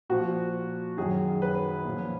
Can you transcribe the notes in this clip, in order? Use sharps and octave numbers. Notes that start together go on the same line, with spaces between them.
A#2 F3 F#4
F#2 D#3 G#4
B4
A#2 F3